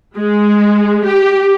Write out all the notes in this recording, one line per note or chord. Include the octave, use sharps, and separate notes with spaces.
G#3
G4